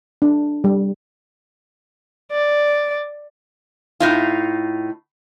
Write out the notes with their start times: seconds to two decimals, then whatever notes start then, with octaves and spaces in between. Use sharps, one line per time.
0.22 D4
0.64 G3
2.32 D5
4.00 A2 D#4 F4